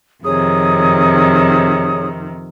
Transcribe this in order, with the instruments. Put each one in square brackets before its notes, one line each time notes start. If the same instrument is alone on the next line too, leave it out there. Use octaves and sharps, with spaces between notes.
[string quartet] F2 C3 D#3 [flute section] G#4 C#5 D#6